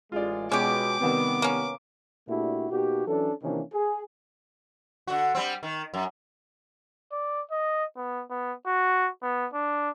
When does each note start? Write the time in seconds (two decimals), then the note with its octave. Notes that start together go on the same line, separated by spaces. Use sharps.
0.12 A1 G#3 F4 D5
0.52 B2 G#3 C#4 G4 D6
1.01 C3 D#3 G3 B3
1.42 A#3 C#4
2.28 A#2 A3 D4 E4 F#4 G4
2.70 B2 A#3 D#4 F#4 G4
3.06 E3 F#3 C#4 D4 A4
3.43 C3 D#3 E3 A#3 C#4 D4
3.72 G#4
5.07 D3 F#4
5.35 G3 C4
5.63 D#3
5.94 F#2
7.12 D5
7.51 D#5
7.96 B3
8.30 B3
8.66 F#4
9.22 B3
9.53 D4